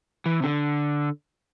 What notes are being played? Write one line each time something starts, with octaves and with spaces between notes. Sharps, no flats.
E3
C3
D3